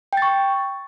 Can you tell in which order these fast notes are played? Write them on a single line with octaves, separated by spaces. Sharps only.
G5 A6 C#6